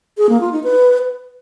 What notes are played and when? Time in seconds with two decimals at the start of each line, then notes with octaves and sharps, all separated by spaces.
0.18 G#4
0.29 A#3
0.41 F4
0.52 D#4
0.64 B4